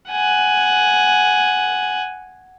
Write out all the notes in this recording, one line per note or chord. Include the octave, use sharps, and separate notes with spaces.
F#5 G#5